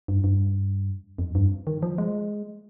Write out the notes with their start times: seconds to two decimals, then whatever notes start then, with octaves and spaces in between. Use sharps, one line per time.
0.08 G2
0.24 G2
1.18 F2
1.35 G2
1.67 D#3
1.82 F3
1.98 G#3